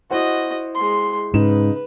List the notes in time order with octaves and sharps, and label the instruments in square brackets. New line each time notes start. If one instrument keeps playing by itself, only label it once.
[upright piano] E4 C5 F#5 [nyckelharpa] F#4 D#5
[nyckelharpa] G#3 C6
[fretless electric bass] G#2 [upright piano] C#3 D#4 E7 [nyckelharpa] B4